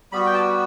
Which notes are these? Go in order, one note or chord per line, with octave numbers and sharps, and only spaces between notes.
G3 B3 F#4 B5
G5
A5